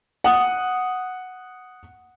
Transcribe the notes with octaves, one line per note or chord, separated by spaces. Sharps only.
F#5 D#6